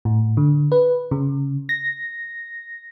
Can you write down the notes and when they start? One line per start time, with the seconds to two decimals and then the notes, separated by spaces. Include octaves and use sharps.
0.05 A2
0.37 D3
0.72 B4
1.11 C#3
1.69 A#6